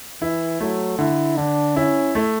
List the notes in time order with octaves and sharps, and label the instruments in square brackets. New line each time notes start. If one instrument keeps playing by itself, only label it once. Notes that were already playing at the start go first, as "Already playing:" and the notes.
[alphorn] E3 [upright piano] E4
[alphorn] F#3 [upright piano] A3
[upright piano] D3 [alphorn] E4
[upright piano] D3 [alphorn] D4
[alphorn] C#4 [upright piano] E4
[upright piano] A3